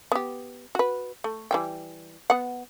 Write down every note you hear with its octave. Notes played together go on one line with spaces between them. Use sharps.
B3 G4
F#4 B4
A3
E3 G3 G5
B3 F#5